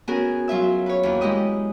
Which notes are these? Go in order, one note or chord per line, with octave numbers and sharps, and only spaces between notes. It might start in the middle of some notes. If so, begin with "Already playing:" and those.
B3 C#4 F#4 G#4 A#4
F#3 F4 E5 E6
B4 C#5
D#2 E3
G#3 E4 G4 D#5 D#6